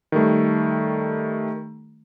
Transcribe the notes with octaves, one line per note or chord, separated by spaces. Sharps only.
D#3 G3 A3